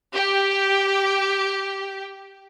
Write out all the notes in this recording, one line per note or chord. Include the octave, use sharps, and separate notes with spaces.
G4